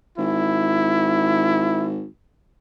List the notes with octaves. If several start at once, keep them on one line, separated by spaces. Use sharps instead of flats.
G#1 E4